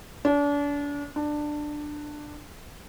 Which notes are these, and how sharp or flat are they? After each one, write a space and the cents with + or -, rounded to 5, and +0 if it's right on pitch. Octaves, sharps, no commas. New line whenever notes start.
D4 -35
D4 +15